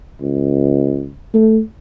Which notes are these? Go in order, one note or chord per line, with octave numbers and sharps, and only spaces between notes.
C#2
A3